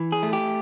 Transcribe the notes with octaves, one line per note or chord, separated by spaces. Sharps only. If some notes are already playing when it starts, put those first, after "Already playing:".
Already playing: E3
G#4
A3
G4